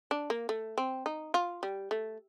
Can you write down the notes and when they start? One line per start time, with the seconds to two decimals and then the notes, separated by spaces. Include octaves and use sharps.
0.11 D4
0.30 A#3
0.49 A3
0.78 C4
1.06 D#4
1.34 F4
1.63 G3
1.91 A3